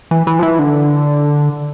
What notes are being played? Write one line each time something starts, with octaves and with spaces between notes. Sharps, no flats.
E3
E3
F3
E3
D3